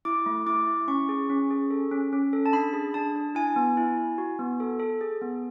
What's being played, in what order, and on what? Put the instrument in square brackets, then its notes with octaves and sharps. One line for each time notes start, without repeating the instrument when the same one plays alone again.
[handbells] E4 D6
A3
E4 D6
E4
C#4 C#6
G#4
C#4
G#4
A4
C#4
C#4
A4
A5
D4 B5
G#4
D4 A5
D4
E4 G#5
B3
E4
E4
F#4
B3
A4
A4
G#4
B3